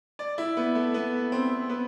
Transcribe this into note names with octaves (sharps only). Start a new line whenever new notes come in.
D5
E4
B3
A3
B3
C4
B3